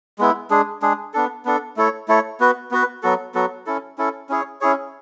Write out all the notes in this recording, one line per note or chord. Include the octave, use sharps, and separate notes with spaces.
G#3 B3 E4
G#3 D4 G#4
G#3 D4 G#4
B3 D4 A4
B3 D4 A4
A3 E4 A4 C#5
A3 E4 A4 C#5
B3 F#4 B4
B3 F#4 B4
F#3 B3 F#4 A4
F#3 B3 F#4 A4
C#4 E4 A4
C#4 E4 A4
C#4 E4 G#4 C#5
C#4 E4 G#4 C#5